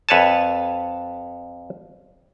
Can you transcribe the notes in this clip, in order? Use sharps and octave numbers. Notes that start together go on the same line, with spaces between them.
F2 B4 C#5 G#5 A5